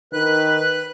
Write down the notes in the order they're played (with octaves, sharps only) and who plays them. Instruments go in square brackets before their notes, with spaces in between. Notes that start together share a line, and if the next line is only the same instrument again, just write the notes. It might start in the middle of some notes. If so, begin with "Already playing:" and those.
[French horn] D#3 [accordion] B4 F#6